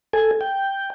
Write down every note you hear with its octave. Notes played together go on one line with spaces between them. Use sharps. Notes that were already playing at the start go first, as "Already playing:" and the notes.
A4 G#5
G5